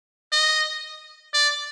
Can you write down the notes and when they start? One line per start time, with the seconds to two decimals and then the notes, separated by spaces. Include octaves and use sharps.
0.32 D#5
1.34 D5